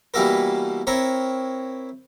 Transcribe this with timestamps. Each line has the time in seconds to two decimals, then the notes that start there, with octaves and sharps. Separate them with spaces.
0.14 B2 E3 G3 A#3 E4 A#4
0.87 C4 E4 A#4 C#5